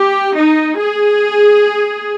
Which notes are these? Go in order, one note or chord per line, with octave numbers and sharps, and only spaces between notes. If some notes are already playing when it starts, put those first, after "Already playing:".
Already playing: G4
D#4
G#4